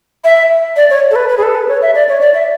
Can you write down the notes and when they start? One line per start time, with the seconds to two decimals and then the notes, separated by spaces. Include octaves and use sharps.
0.24 E5
0.76 D5
0.90 C#5
1.11 A4
1.16 B4
1.29 B4
1.37 G#4
1.43 A4
1.55 B4
1.68 C#5
1.82 E5
1.95 D5
2.09 C#5
2.21 D5
2.34 E5